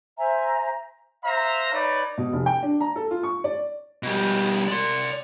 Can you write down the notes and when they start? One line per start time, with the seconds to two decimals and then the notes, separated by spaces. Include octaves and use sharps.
0.18 C5 E5 G#5 A#5
1.25 C5 E5 F5 A#5
1.73 D#4 B4 C#5 D5
2.18 B2
2.33 F1
2.46 G5
2.63 D4
2.81 A#5
2.96 A4
3.11 F4
3.23 C#6
3.44 D5
4.03 B2 G3
4.68 D5 C6